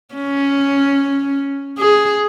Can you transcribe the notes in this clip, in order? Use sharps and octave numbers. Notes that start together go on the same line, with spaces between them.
C#4
G#4